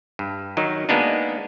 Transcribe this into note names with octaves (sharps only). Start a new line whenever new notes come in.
G2
D#3 F#3 D#4
G#3 A#3 B3 D4 D#4